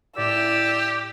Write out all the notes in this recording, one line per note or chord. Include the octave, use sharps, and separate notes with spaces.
A2 G4 D5 E6